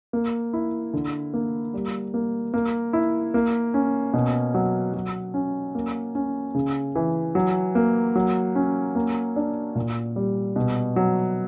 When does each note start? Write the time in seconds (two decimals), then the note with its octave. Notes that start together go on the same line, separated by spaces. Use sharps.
0.13 A#3
0.53 E4
0.93 D3
1.34 A#3
1.74 G3
2.14 A#3
2.54 A#3
2.93 E4
3.34 A#3
3.74 C#4
4.13 B2
4.54 F#3
4.94 F#3
5.34 C#4
5.75 A#3
6.15 C#4
6.55 C#3
6.96 E3
7.35 F#3
7.75 A#3
8.15 F#3
8.55 C#4
8.95 A#3
9.36 D4
9.75 A#2
10.16 G3
10.56 B2
10.96 F#3